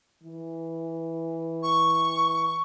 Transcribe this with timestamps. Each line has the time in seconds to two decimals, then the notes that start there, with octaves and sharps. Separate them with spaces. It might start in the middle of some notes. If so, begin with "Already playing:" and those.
0.24 E3
1.63 C#6